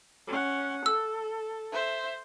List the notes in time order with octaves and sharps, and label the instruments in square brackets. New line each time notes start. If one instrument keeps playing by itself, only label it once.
[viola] C#4 F#5
[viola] A4 [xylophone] E6
[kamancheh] C5 E5